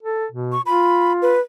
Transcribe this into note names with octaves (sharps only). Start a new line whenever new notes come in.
A4
B2
C#6
F4 B5
B4